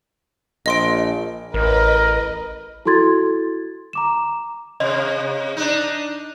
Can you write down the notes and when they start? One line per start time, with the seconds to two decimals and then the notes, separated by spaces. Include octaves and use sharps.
0.66 A#1 D#5 C6 D7
1.54 A1 A#4 B4 D#5
2.86 E4 F#4 A4 C6 G#6 A6
3.93 A#5 D6 E7
4.80 C3 D#5
5.57 D4 D#4